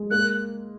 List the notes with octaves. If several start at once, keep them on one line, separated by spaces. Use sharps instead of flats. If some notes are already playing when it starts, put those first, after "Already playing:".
Already playing: G#3
A#3 F#6